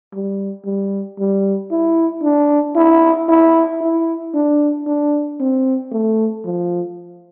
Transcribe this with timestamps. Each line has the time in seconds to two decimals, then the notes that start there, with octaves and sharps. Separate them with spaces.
0.14 G3
0.65 G3
1.19 G3
1.71 E4
2.23 D4
2.76 E4
3.29 E4
3.81 E4
4.34 D4
4.87 D4
5.40 C4
5.92 A3
6.45 F3